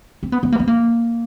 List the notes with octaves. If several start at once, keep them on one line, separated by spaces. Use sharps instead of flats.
C4
B3
B3
A#3
B3
A#3